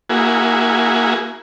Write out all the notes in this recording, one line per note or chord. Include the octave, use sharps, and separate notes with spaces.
A#3 E4 F#4 G#4